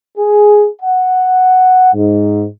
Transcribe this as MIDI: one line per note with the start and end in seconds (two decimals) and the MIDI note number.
0.18 0.67 68
0.81 1.90 78
1.94 2.46 44